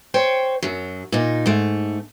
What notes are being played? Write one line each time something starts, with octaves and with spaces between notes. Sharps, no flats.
C5 C#5 G5
F#2 F#3
A#2 D#4
G#2 A3